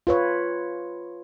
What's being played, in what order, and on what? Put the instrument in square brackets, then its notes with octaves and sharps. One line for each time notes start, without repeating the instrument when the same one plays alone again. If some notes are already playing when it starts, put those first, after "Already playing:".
[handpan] F4 B4 C#5